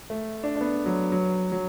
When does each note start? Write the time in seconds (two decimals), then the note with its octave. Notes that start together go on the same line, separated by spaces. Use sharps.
0.10 A3
0.44 D4
0.56 D4
0.61 B3
0.86 F#3
1.12 F#3
1.52 F#3